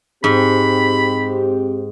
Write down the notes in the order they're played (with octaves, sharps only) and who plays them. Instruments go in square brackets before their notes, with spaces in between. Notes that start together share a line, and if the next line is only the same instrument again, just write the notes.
[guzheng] G#2 [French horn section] C4 G4 [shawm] B5